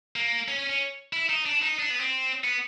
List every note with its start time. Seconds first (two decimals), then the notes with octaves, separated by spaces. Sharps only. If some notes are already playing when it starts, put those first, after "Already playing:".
0.16 A#3
0.48 C#4
0.59 C#4
0.69 C#4
1.13 E4
1.29 D#4
1.46 D4
1.62 D#4
1.79 D4
1.90 B3
2.00 C4
2.44 B3